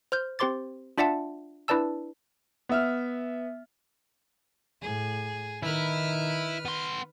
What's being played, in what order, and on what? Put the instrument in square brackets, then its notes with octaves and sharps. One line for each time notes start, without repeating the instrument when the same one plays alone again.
[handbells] C5 F6 G6
C4 G4 C5 C6 D6 A6
D4 F4 D5 E5 F#5 A5
D4 E4 B4 D5 A5 E6
[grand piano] B3 E5 F6
[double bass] A2 [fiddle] G#4
[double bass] D#3 D#4 [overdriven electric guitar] E4 [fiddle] B4 F6
[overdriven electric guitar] B3 C6